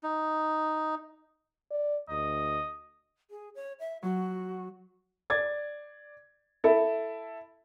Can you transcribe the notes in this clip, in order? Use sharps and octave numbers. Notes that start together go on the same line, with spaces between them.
D#4
D5
D2 D#5
G#4
C#5
E5
F#3 F#4
D5 G#6 A6
E4 A4 B5